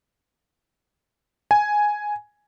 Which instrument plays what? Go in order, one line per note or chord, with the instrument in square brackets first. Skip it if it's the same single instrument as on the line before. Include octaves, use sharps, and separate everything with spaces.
[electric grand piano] G#5